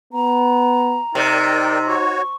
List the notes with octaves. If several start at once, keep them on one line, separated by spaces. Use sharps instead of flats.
B3 A#5
C3 D#4 A#4 D5 G5
F#4 C#5 C#6